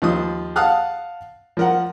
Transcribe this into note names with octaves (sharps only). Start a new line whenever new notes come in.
D#2 F3 D#6
F5 F#5 A5 D#6 F6 F#6
F3 A#4 F#5